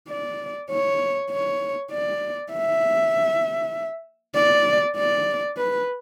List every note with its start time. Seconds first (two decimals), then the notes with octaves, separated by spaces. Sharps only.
0.08 D5
0.70 C#5
1.30 C#5
1.91 D5
2.52 E5
4.35 D5
4.96 D5
5.57 B4